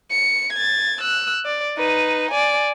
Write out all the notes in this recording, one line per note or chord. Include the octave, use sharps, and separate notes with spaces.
C#7
G#6 A6
E6 F#6
D5
D#4 B4
D5 G#5